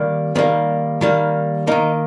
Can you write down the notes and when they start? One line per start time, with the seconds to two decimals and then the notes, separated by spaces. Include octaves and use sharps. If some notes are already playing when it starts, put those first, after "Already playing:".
Already playing: D#3 G3 A#3
0.35 D#3 G3 A#3 C4
1.01 D#3 G3 A#3
1.67 D#3 A#3 D#4